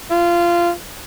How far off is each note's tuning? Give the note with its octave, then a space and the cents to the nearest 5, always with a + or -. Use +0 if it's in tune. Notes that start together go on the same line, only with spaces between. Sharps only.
F4 -20